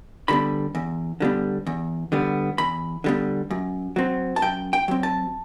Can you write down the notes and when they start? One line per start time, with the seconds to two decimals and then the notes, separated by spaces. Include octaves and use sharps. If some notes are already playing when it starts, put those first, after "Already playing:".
0.28 D3 G3 B3 B5
0.75 E2
1.20 D3 G3 B3
1.67 E2
2.12 D3 G3 B3
2.58 E2 B5
3.04 D3 G3 B3
3.50 F#2
3.96 F#3 C4
4.36 A5
4.42 F#2 G5
4.73 G5
4.88 F#3 C4
5.03 A5